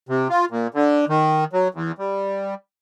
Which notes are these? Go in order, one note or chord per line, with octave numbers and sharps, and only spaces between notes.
C3
F4
A#2
D3
D#3
F#3
E2
G3